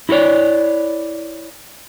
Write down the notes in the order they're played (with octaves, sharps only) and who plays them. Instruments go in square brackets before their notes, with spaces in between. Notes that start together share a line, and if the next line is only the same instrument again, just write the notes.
[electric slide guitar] E4 F#4 A4 C#5 D5